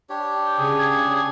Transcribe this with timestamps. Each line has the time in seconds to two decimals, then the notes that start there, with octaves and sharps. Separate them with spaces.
0.10 D4 G4 C#5
0.45 G5
0.58 C#3 G#4
0.79 G#6